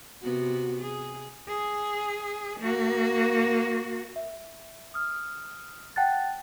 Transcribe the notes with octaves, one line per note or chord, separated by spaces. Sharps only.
C3 B3 F#4
G#4
G#4
A#3 F#4
E5
D#6 F6
F#5 G5 A5 F#6 A6